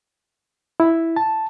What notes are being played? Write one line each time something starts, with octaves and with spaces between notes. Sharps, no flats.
E4
A5